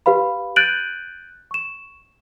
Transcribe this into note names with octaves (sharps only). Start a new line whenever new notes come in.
G4 B4 F5 B5
F#6 G6 A6 D7 D#7 F#7
C#6 E7